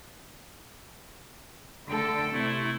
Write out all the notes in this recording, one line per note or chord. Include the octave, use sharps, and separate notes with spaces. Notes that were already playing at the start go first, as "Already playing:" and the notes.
D3 A3 A4 G5
C3 A3 E4